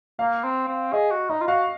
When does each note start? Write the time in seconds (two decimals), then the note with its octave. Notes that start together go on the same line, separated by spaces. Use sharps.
0.19 A#3 F5
0.44 C4
0.68 C4
0.93 G#4 D#5
1.11 F#4
1.29 D#4 D#5
1.41 F4
1.47 F#4 F5